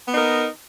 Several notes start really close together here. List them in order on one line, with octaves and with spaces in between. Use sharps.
B3 D#4 A#4